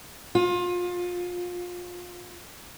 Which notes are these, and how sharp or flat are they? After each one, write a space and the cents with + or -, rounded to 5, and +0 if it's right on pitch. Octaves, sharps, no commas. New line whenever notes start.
F4 +25